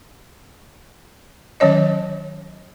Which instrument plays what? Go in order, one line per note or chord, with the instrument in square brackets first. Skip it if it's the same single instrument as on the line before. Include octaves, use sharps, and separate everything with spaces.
[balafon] D#3 F#3 C#4 C#5 D#5